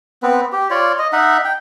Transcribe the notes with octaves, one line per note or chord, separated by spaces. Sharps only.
B3 C4 B4
G4
F4 C#5 D5
D#5
D#4 E5 F#5
G5